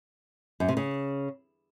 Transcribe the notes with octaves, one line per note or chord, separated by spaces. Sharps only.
F#2
C3
C#3